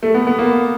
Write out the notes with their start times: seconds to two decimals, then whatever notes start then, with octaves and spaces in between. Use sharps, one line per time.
0.03 A3
0.14 B3
0.27 B3
0.39 A#3